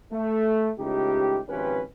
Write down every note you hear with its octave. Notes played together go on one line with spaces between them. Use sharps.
A3
C#2 A2 D#4 G4
G#1 C3 F3 C#4 G4 B4